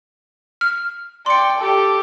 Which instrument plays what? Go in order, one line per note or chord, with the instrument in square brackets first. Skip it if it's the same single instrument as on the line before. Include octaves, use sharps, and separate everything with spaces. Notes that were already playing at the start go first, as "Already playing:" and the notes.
[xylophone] F6
[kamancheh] D5 G5 [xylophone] C6 C#7
[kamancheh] G4 A4